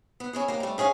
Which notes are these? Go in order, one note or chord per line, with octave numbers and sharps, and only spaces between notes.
B3
C#4 E4 G#4
A#3 G4
G3 A3
C#4 G#4 C#5 F5